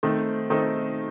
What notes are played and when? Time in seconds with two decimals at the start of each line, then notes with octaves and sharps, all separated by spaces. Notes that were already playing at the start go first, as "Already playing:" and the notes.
0.03 D#3 A3 C4 D#4 C5
0.50 D#3 A3 C4 D#4 A4